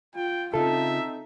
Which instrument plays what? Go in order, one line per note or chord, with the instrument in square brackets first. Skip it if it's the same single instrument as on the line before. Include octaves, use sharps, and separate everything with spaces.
[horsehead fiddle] F4 [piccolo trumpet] G5
[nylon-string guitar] C#3 F4 [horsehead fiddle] C4 D#4 [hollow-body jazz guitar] A4 [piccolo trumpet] E5